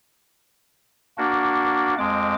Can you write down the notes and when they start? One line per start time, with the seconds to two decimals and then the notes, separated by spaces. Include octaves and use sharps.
1.18 A#3 D4 F#4
1.98 F2 G#3 D6